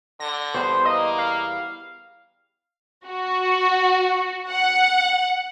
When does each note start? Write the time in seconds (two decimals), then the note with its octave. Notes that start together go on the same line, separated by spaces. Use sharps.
0.20 D3 A#6
0.54 E2 G3 B3 C5
0.85 A#3 D#5
1.18 F5
3.07 F#4
4.49 F#5